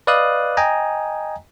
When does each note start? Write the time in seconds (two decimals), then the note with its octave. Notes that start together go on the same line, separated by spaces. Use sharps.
0.07 B4 D5 D#5 F5 D#6 F#6
0.57 D#5 G5 G#5 A#5